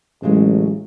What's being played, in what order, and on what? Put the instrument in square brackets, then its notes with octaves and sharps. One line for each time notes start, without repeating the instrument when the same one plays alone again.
[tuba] A1 [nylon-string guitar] C#3 F#3 G#3